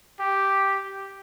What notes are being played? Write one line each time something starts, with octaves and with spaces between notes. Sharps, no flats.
G4